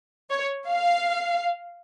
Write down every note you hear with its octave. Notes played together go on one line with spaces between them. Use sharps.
C#5
F5